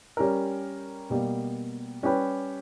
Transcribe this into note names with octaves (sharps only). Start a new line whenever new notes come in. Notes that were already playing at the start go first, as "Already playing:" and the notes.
G3 C#4 G4 A#4
B2 G3 A#3
G3 C#4 G4 B4